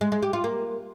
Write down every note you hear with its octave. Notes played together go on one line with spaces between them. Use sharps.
G#3
G#3
G4
F4
A#3